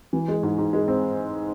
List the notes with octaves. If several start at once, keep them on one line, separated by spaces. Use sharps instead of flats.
E3
G#3
G#2
G#2
G#3
C4